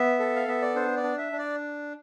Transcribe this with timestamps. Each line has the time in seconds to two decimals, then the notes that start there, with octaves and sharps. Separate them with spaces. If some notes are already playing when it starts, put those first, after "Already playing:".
Already playing: B3 E5
0.20 A4
0.36 F5
0.48 B3 E5
0.62 D5
0.75 D4 C5
0.97 D5
1.03 D4
1.18 E5
1.32 D4
1.38 D5